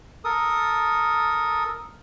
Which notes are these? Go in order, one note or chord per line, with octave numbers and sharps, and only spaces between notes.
A4 A#4 D#6